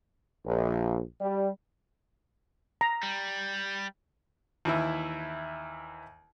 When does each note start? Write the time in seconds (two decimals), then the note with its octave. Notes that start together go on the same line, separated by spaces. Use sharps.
0.46 A#1
1.21 G3
2.81 A#5
3.03 G3
4.65 D#2 E3 E4